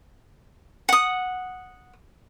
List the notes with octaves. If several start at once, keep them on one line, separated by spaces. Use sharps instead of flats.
F#5 D#6